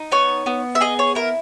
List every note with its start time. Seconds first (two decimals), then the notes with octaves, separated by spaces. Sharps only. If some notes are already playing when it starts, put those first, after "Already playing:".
Already playing: D#4
0.12 B3 C#5
0.46 B3
0.75 E5
0.81 G#4 D#5
0.99 C#5
1.15 E4 A#4